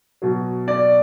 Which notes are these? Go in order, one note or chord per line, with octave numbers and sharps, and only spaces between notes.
B2 F#3
D5